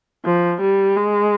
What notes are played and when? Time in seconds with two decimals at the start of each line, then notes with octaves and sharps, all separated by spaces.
0.25 F3
0.61 G3
0.97 G#3